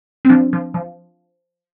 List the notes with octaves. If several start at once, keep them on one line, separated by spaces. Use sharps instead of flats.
C4
F3 D4
F3
F3